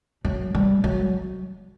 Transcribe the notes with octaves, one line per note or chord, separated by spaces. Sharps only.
F#3
G3
F#3